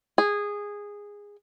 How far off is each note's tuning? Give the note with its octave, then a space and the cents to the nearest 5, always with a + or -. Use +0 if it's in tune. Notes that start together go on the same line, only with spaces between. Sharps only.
G#4 -15